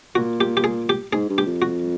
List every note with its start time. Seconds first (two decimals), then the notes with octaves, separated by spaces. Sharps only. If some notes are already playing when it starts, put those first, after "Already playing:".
0.15 A#2 F#4
0.41 G4
0.57 G4
0.64 G#4
0.89 G4
1.13 G#2 G#4
1.29 G2
1.38 G4
1.46 F2
1.62 F#4